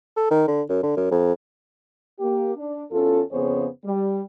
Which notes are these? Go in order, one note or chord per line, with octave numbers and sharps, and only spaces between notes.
A4
D#3
D3
F#2
D3
F#2
F2
A#3 G4
D4
E2 C#4 F4 A4
F2 C#3 B3 G#4 C5 C#5
G3